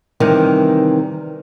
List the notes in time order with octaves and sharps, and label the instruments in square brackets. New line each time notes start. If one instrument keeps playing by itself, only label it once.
[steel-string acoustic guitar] C3 D#3 E3 G3